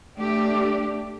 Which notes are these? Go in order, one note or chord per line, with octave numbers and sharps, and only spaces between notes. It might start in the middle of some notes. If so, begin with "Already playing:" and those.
A3 D4 G4